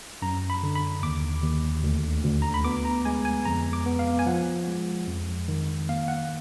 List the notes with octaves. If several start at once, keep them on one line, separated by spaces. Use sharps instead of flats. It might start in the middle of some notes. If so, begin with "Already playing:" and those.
F#2 A#5
B5
D3
B5
D#2 D6
D#2
D2
D2
A#5
B5
B3 D6
A#5
G#3 G#5
G#5
F2 A#5
D6
B3
F5
G#5
F3 F#5
G#3
F2
D#3
A#3 F5
F#5